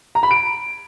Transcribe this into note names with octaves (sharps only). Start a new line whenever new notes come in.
A#5
B5
D7